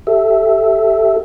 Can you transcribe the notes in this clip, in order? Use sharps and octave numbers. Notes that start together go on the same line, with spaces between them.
G4 A4 E5